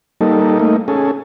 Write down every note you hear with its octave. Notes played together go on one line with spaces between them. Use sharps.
G3 A#3 D#4 A4
A3 A#3 D#4
C#4 G#4 A4